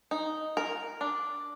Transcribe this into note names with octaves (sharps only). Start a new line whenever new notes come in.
D#4
A#4
D4